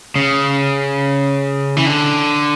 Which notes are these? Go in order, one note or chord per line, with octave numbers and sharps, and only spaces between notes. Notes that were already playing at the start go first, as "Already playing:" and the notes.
C#3
E3
D3